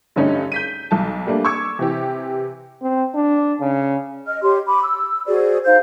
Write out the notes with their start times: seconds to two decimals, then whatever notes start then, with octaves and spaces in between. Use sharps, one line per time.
0.16 G2 D3 G3 A3 C#4 D#4
0.52 G6 B6 D#7
0.91 B1 A5
1.27 G3 A3 A#3 D4
1.45 C#6 D6 E6 G#6 C#7
1.79 C3 E3 G4
2.82 C4
3.15 D4
3.61 C#3
4.26 D#5 F6
4.43 G4 C#5 C6
4.66 B5 D6
4.83 E6
5.26 F#4 G#4 C5 D5
5.65 D#4 C5 F5 G6